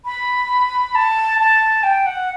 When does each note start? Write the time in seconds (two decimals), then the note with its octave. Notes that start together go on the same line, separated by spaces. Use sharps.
0.05 B5
0.95 A5
1.39 A5
1.83 G5
2.06 F#5